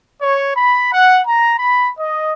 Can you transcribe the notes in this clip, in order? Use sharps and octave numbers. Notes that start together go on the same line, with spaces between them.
C#5
B5
F#5
A#5
B5
D#5